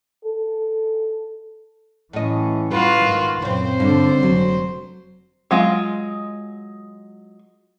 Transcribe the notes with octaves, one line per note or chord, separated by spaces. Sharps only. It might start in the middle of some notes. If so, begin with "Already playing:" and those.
A4
A2 E3 C#4 D#5
G3 F4 F#4 B4
G#2 D#3
F#2 A#2 C#3 C4 C5
G2 D3 D4
F1 F#3
F#3 G#3 F4